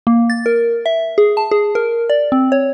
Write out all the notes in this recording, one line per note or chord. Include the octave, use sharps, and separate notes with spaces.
A#3
A6
A#4
E5
G#4
A5
G#4
A#4
D5
C4
C#5